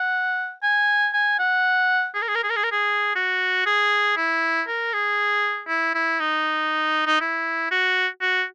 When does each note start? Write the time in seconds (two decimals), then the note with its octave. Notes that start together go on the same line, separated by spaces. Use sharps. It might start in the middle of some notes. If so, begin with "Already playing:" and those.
Already playing: F#5
0.63 G#5
1.14 G#5
1.39 F#5
2.15 G#4
2.22 A#4
2.28 G#4
2.35 A#4
2.43 G#4
2.50 A#4
2.56 G#4
2.64 A#4
2.72 G#4
3.16 F#4
3.66 G#4
4.17 E4
4.68 A#4
4.93 G#4
5.68 E4
5.94 E4
6.20 D#4
7.07 D#4
7.21 E4
7.72 F#4
8.21 F#4